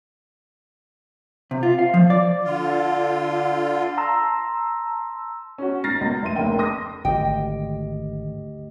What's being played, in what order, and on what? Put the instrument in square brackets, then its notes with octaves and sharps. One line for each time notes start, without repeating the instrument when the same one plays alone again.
[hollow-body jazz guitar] C3
F4
F5
F3
D5
[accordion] D3 F4
[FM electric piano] A5 A#5 C6 E6
[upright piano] C#4 F#4
G#1 A#5 F6 A6 A#6 C7
C#2 B2
F1 E5 C6 D#7
F1 C#3 A#3 G5
C6 D#6 A#6
[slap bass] G#1 [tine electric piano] D2 G4 D#5 [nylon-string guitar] G5